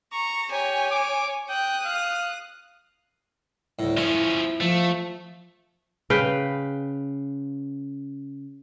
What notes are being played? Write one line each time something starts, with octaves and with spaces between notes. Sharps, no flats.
A#5 C#6
G4 C#5 G#5
D6
G5 D#6 F#6
F5
D2 A2
F3 C#4 E4
F3 A3
C#3 B4 F5 G5